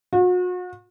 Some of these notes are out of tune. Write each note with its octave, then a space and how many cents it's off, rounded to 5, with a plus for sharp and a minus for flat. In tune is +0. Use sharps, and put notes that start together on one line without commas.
F#4 -40